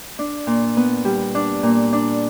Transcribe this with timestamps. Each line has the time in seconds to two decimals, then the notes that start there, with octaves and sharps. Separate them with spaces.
0.19 D4
0.47 A#2
0.77 B3
1.05 G3
1.35 D4
1.63 A#2
1.93 D4